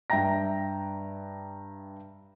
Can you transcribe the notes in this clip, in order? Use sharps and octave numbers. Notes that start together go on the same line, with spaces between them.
G2 E5 G5 A#5 A#6